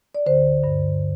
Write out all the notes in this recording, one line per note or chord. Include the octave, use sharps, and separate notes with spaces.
D5
D2 D3 C5
G2 D3